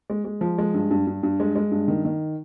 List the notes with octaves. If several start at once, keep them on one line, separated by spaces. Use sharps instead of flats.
G#3
G#3
F3
G#3
G2
G2
G2
G2
G#3
G#3
G2
D#3
D#3